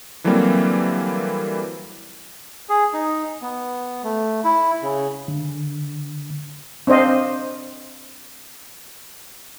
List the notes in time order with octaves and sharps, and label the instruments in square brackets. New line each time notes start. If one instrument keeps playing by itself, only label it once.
[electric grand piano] D3 E3 F#3 G3 A#3 C4
[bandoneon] G#4
D#4
B3
A3
E4
C#3
[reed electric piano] D3
[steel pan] C4 D4 C5 D#5 F5